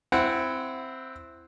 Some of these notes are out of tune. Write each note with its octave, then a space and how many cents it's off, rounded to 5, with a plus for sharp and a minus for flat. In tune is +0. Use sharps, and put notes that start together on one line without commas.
C4 +0 E4 +15 F#5 +0